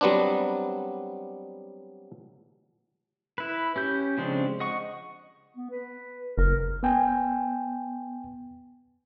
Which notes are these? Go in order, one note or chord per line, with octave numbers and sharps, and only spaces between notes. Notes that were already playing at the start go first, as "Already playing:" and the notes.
F#3 G3 B3 C4 D4
E4 B4
C#4 G4 G6
C#3 F3 G#3 C4 D4
D#5 F#5 C#6
B3
B4
F#1 A#4
B3 G5 G#5